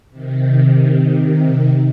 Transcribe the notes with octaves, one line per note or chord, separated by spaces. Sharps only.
C3 D#3